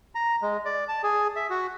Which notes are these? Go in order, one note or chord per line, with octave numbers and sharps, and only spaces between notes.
A#5
G#3
D5
A5
G#4
E5
F#4